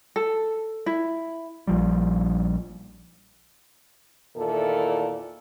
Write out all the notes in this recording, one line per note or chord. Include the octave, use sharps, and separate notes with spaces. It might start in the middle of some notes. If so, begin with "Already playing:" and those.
A4
E4
A#1 F3 G3
E2 A#2 D#3 E4 A4